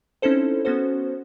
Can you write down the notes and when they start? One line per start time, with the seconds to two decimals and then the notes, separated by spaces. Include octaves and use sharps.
0.22 C4 C#4 D#4 E4 A4 C5
0.65 B3 C#4 F#4 A4 C5